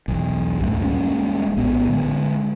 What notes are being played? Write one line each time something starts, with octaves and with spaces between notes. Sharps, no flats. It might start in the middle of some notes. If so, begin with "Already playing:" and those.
B1 E2
C#2 F#2 A2
D#1 G#3 A#3 C#4
A#1 A2 B3
D3 G#3